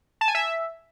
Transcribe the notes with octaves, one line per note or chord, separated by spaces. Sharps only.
A5
G#5
E5